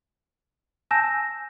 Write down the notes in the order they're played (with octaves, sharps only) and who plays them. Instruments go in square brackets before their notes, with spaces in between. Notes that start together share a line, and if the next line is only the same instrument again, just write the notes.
[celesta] G#5 A5 E6 G6 A#6 E7